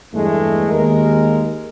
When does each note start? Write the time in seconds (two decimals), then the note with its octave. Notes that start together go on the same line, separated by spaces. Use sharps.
0.14 E2 G2 G#3 A3
0.70 D#2 G#3 A#4